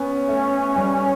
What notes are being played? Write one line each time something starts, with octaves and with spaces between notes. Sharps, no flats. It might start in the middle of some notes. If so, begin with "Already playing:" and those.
Already playing: B3 C#4
A3
G3